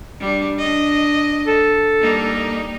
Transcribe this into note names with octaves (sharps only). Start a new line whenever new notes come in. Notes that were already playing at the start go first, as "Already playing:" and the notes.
G3 D4
D4 D#5
A4
G3 A#3 D#4